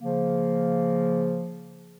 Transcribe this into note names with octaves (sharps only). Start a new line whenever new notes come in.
C#3 F3 A#3